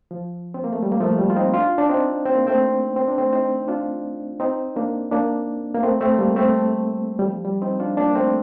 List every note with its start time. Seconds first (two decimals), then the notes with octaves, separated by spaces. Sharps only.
0.11 F3
0.54 C4
0.64 A#3
0.73 A3
0.83 G3
0.92 A#3
1.00 F3 A3
1.18 G3
1.30 F4
1.36 C4 D#4
1.54 D4 F4
1.78 D4
1.89 C4 D#4
2.26 C4
2.36 A#3
2.47 A3 C4
2.96 C4
3.08 D4
3.18 A3 C4
3.33 C4 D#4
3.68 D4 F4
4.40 C4 D#4
4.76 A#3 D4
5.12 A#3 D4
5.75 A#3
5.82 A3 C4
6.01 A3 C4
6.18 G3 A#3
6.36 A3 C4
7.19 G3
7.26 F3
7.45 G3
7.62 C4 D#4
7.80 D4 F4
7.97 A#3 D4
8.15 A3 C4